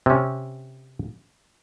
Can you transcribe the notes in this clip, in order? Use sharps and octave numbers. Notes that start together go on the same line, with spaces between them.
C3 C#4